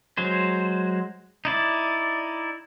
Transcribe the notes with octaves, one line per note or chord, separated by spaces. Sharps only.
F#3 G#3 C5
D#4 E4 D5